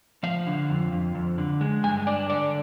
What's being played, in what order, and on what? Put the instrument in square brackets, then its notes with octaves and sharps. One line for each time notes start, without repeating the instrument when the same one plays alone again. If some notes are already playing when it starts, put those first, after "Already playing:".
[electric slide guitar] F3 F5
D3
F2
F2
F2
D3
G#3
G2 G#5
D4 D5
D3 D5